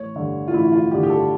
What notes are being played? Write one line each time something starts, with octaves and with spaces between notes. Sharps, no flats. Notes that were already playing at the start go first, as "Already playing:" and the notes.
Already playing: A1 C#5
G2 D3
F4
A1 E4
F4
G2 D3 G4
G4
A4